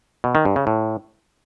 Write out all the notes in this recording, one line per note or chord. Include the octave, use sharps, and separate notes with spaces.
B2
D#3
G2
C#3
A2